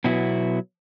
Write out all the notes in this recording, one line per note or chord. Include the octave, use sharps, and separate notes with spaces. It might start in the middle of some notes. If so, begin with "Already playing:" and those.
B2 F#3 B3 E4